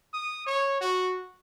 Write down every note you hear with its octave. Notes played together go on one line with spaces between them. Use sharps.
D#6
C#5
F#4